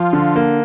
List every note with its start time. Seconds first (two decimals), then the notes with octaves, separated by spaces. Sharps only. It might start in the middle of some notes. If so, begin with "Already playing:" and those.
Already playing: F3 F4
0.13 D3
0.36 A#3